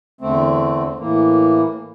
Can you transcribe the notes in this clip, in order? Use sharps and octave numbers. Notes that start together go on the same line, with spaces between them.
E2 D3 A3 C4
A2 E3 A#3